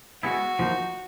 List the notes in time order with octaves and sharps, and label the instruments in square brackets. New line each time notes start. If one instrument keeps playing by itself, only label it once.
[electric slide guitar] G#3 B3 E4 [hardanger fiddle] F#4
[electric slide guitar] F3 A#3 D#4